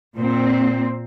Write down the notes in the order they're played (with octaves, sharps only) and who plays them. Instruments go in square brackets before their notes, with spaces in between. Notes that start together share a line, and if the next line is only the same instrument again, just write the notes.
[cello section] A#2 C4